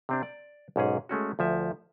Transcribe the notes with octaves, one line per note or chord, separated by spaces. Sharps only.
C3 C4 D4
D5
B1 G#2 C#4 G#4
G#3 A3 C#4 F#4
D2 F3 E5